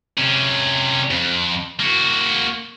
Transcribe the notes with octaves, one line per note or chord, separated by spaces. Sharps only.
C3 C#4
F2
A#3 F#4